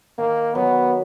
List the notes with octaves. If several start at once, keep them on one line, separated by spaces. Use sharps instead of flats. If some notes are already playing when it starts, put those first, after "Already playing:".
D#3 A#3
F#3 B3